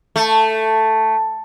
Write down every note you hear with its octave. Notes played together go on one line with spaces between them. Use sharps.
A3